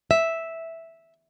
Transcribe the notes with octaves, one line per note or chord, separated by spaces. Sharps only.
E5